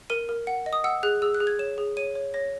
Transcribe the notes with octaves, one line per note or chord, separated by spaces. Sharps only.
A#4 D#7
A#4
F#5
D#5
D#6
F#5 E6
G#4 F#6
G#4 E6
F#6
G#4
G#6
C#5 E7
G#4
C#5 D#7
C#5
C#5 A#6